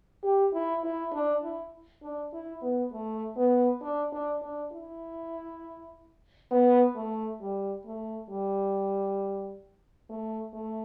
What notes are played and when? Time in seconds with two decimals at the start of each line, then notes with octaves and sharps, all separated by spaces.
0.24 G4
0.53 E4
0.84 E4
1.13 D4
1.43 E4
2.03 D4
2.33 E4
2.62 B3
2.93 A3
3.37 B3
3.82 D4
4.12 D4
4.42 D4
4.72 E4
6.51 B3
6.96 A3
7.41 G3
7.86 A3
8.30 G3
10.10 A3
10.54 A3